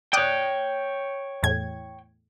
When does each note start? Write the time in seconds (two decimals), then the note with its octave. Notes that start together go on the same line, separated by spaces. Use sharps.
0.13 C#5 D5 G5 D#6 F#6
1.43 E2 A2 G#6